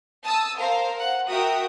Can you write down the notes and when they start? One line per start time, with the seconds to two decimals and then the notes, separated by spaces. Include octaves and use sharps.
0.24 A5 D#6 E6
0.57 A#4 C5 F5
0.98 F#5
1.29 F#4 A#4 E5 G5 D#6